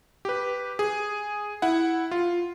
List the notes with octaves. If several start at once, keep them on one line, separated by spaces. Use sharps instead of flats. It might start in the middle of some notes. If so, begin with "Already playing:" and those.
G4 B4
G#4
E4 F#5
F4